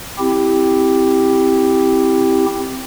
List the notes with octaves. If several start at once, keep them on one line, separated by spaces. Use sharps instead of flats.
C4 E4 G4